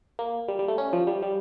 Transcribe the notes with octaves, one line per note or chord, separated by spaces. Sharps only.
A#3
G3
G3
A3
C#4
F3
G3
G3